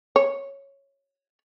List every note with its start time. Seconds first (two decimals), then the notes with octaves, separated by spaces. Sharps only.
0.16 C#5